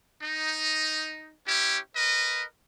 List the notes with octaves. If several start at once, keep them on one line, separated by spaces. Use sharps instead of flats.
D#4
C#4 E4 G4
A#4 B4 D#5